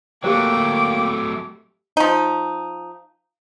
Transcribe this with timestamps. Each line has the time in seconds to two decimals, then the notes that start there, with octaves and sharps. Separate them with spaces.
0.24 F#3 A3 A#3 G4 C5 G5 D6
1.97 F3 D#4